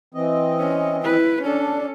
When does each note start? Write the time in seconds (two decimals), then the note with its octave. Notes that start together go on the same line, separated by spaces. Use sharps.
0.14 E3 C4 D#5
0.59 C#4
1.04 E4 B4
1.43 C#4 D4 A4